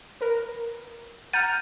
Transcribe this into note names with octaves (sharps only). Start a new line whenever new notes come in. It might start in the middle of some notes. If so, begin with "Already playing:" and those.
A#4 B4
F#5 A#5 F6 G6 A6 D#7